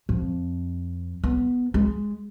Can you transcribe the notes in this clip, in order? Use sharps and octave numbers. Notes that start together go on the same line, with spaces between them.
F2
B3
G#3